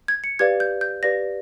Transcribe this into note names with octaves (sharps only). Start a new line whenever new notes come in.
G#6
C#7
G4 B4 D5 F5 G#6
G6
G6
G4 B4 D5 F5 A#6